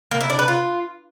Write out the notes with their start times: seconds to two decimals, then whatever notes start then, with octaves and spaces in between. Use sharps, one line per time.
0.11 A#3
0.21 E4
0.30 D4
0.39 B4
0.48 F4